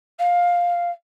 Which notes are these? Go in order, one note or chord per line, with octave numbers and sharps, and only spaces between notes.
F5